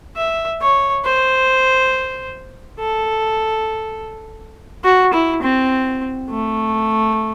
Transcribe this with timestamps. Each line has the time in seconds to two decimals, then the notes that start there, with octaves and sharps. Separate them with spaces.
0.17 E5
0.62 C#5
1.05 C5
2.80 A4
4.84 F#4
5.13 E4
5.42 C4
6.30 A3